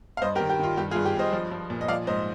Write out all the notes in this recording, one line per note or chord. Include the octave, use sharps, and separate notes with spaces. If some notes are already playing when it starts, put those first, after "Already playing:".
F5
G2 C5 D#5
G4 A#4
D#3
G4
D#3 F4
G2 G4
F4 G#4
G2
G4
G2 C5 D#5
F3
F3
A#2
D#5
F3 D5 F5
G#2 C5 D#5